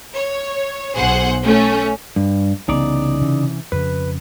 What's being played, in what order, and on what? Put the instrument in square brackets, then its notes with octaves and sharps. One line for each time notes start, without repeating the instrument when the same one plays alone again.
[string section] C#5
B1 G#4 C5 F#5
A3 C#4
[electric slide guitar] G2
[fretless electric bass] C2 E3 B3 [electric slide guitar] C#3 D#4 D5
[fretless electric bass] C3 E3 C#4
[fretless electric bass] F2 C#3 [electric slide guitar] B4